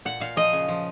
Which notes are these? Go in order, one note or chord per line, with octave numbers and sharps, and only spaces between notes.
A#2 F#5
A#2 F5
F3 D#5
C#3
F3